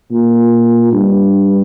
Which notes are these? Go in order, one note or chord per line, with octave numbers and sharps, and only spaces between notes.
A#2
G2